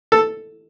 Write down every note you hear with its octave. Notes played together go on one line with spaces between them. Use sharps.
A4